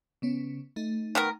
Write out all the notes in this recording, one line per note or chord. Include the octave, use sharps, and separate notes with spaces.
C#3 B3 C#4
A3 D#4
D#3 B3 A#4